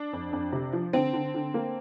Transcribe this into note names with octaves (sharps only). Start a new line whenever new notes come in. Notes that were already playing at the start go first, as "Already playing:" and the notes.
Already playing: D4
F2
F2
C3
F3
D3 C4
D3
D3
A#3